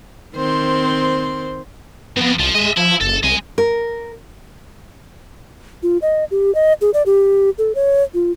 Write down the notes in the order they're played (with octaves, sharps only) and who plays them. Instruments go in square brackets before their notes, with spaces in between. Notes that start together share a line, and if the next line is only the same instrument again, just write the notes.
[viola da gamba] D#3 C4 C5
[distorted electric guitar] F2 G#2 [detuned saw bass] B3
[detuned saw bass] C2 [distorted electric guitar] F3
[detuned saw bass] G#3 [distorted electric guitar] D#5 E5
[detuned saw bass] F3 [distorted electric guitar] E4
[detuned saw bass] F#1 [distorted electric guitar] A4
[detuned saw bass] C2 [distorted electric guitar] G#3 G#5
[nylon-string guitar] A#4
[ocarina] F4
D#5
G4
D#5
G#4
D5
G4
A4
C#5
F4